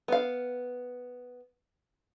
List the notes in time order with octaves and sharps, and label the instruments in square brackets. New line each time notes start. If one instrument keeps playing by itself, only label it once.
[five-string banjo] B3 F5